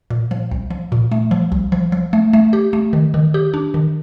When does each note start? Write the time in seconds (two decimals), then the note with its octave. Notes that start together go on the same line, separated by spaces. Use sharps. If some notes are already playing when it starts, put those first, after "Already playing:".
0.10 A#2
0.31 F3
0.51 C2
0.71 F3
0.92 A#2
1.12 A3
1.31 F3
1.52 C2
1.72 F3
1.92 F3
2.13 A3
2.33 A3
2.53 G4
2.73 A3
2.93 D#3
3.14 D#3
3.34 G4
3.54 D4
3.74 D#3